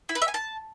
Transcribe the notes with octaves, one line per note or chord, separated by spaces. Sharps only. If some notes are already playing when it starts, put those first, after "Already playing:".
E4
B4
E5
G#5
A5